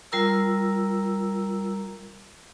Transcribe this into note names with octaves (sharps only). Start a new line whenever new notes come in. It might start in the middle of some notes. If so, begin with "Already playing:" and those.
G3 F4 A#4 A#5 E6